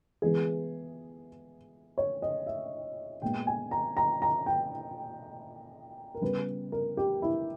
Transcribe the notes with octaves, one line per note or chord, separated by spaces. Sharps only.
E3 G#3 B3 G#4
C#5
D#5
E5
A#2 G#3 B3 G5
G#5
A#5
A#5
A#5
G5
A#4
C#3 G3 B3 B4
A#4
G4
E4